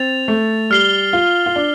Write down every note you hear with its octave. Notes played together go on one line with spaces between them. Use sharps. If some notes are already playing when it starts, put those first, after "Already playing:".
Already playing: C4 A6 F7
A3
G3 F6 C7 G7
F4
F4
D4